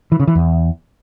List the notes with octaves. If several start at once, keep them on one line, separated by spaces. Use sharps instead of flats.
E3
C#3
E3
E2